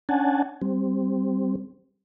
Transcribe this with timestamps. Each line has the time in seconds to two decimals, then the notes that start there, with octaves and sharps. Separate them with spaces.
0.09 C#4 D4 F#5 G#5 A5
0.62 G3 C4